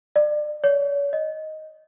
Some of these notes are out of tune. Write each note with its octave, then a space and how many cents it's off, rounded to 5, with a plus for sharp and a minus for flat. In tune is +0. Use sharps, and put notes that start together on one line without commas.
D5 +30
C#5 +40
D#5 +5